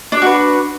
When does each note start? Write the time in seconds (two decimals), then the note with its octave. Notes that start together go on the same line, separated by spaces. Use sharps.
0.12 D4
0.17 D5
0.22 F#4
0.27 B4